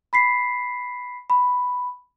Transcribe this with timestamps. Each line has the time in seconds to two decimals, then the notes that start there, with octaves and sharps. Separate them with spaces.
0.13 B5 B6 C7
1.30 B5